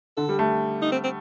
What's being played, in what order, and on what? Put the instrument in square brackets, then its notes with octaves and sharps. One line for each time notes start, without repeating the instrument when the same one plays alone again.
[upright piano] D3 [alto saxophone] A4
[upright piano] G3
A3
[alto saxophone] D#4
C4
C4